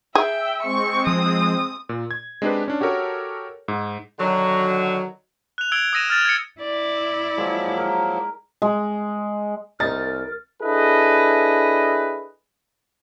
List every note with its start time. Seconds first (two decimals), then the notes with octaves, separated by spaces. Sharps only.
0.15 G#4 E5 G5
0.62 G#3 C4 C#6
1.07 F3 D#6
1.89 A#2
2.11 G#6
2.42 G#3 C4 D4 D#4 G4 B4
2.68 C#4 D4
2.81 F#4 G4 A4 A#4 C#5
3.68 G#2
4.19 D3 D#3 F#3
5.58 F#6 F7
5.72 E6 G#6 D7 F7 G7
5.93 D#6 E6 A#6 D#7 E7
6.10 F6 A6 F7
6.25 G#6 C#7
6.61 E4 D5
7.37 F3 F#3 G#3 A#3 G#5
7.77 A#4 A#5
8.62 G#3
9.80 C2 D#4 A#4 A6
10.62 D4 E4 G#4 A4 B4 D#5